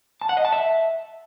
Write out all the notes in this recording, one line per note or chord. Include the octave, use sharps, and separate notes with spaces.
A5
F#5
D#5
A5
E5